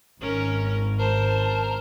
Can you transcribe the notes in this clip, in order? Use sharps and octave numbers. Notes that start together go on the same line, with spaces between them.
G#1 C#4 A#4
A#4 C5 A5